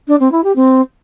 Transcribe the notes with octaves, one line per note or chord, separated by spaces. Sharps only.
D4
C4
E4
G4
C4